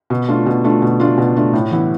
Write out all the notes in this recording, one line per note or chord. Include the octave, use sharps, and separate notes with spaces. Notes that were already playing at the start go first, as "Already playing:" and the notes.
B2
A3 D4 F4
B2
A3 D4 F4
B2
A3 D4 F4
B2
A3 D4 F4
A2
E3 B3 E4